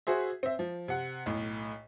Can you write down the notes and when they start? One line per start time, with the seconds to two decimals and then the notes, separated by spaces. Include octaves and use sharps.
0.07 F#4 G#4 C5 E5
0.43 C4 E5
0.59 F3
0.88 C3 F#5
1.26 B1 A2